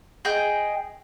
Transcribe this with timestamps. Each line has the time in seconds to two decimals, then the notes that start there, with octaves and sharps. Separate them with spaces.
0.25 G#4 D#5 G5